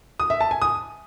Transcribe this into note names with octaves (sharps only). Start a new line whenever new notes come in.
D#6
E5
A5
G#5
D#6